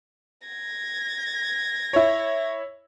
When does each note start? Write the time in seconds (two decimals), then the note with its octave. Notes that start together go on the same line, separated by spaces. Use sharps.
0.48 G#6 A#6
1.93 E4 C#5